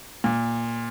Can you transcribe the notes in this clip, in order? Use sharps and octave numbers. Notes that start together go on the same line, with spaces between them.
A#2